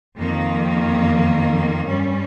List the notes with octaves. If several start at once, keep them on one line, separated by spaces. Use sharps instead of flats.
F2 D#3 A#3
G2 G3 C#4